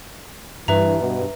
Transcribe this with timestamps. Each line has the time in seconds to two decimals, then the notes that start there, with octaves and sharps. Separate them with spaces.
0.68 G2 E3 B4 E5 A#5
1.02 B2